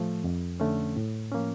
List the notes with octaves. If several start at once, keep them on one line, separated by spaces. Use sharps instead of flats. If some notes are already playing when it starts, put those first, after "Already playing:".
Already playing: A2 F3 A3
F2
D3 A3 C#4
A2
F3 A#3 C#4